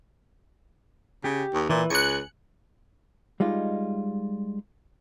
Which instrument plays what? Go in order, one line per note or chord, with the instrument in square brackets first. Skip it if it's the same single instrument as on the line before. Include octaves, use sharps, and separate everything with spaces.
[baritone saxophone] C#3 [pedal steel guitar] G4
[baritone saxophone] D#2
[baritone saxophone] A#2 [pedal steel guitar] E3
[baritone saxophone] C#2 [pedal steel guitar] G#5 [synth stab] F#6 C#7
[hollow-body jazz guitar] G3 G#3 D#4 F4